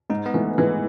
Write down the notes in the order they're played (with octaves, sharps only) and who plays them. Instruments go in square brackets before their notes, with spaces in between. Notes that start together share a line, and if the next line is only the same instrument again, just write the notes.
[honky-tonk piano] G#2 [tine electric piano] D#4
[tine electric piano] B3
[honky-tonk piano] E3 [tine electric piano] A3
[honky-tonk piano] E3 [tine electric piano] G#3